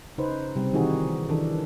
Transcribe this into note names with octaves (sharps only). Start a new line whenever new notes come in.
C#3 D#4 B4 C5
C3 G3 C4
B2 D#3 E3 D#4 F#4 G#4
D#3 E3 D4 A4